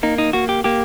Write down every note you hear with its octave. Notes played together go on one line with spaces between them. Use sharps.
A#3 D#4
D#4
A#3 F#4
G4
A#3 G4